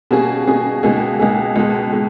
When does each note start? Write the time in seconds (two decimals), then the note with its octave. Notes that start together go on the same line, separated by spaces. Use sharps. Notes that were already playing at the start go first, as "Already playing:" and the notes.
0.11 B2 G3 A#3 C#4 G#4
0.47 B2 G3 A#3 C#4 G#4
0.83 C#2 B2 A#3 D#4 G#4
1.19 C#2 B2 A#3 D#4 G#4
1.56 C#2 B2 G#3
1.93 B2 G#3